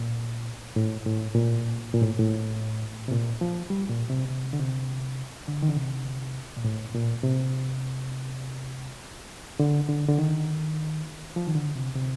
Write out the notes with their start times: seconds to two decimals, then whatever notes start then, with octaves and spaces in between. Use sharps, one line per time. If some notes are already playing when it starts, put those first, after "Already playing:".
Already playing: A#2
0.76 A2
1.06 A2
1.35 A#2
1.94 A#2
2.02 A2
2.19 A2
3.08 C3
3.12 A#2
3.41 F3
3.70 G3
3.90 A#2
4.10 C3
4.29 C3
4.53 D3
4.60 C3
5.48 D3
5.62 D#3
5.69 D3
5.77 C3
6.57 A#2
6.64 A2
6.95 A#2
7.24 C3
9.60 D3
9.89 D3
10.08 D3
10.18 D#3
11.36 F3
11.47 D#3
11.55 D3
11.76 C3
11.95 C3